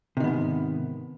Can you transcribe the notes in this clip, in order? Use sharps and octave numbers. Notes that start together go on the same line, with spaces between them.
G#2 C3 D#3 B3